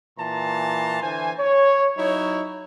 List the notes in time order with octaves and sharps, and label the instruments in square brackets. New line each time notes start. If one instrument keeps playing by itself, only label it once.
[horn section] A#2 E3 A5 A#5 C6
D3 E3 C5 G#5
C#5
F#3 D#4 E4 C#5